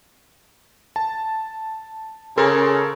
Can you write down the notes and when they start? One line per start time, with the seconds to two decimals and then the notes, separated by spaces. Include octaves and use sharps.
0.96 A5
2.38 C#3 A4 A#4 C6